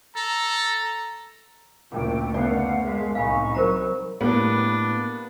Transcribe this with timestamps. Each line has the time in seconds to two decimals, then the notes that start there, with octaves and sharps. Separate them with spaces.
0.16 A4 A#5
1.92 F#1 D2 A#2 A3 G5
2.34 F#1 B3 D5 F5 F#5
2.83 G#3 E5 F5
3.15 C2 A2 D#4 F5 G#5 B5 C#6
3.55 F#3 A#4 C5 A#5
4.21 A2 G3 A#3 B3 D4